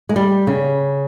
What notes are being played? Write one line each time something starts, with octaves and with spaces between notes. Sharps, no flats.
G#3
G3
C#3